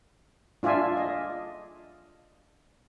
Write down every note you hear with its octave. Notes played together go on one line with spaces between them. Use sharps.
D4 F4 D5 E5 G#5
D#5